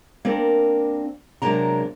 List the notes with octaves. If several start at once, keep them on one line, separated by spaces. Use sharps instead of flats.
A#3 C4 D4 A#4
C3 F#3 G#3 A#3 D4 A#5